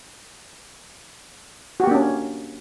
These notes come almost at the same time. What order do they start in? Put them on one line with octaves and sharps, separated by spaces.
F#4 G4 A#3 D4 C#4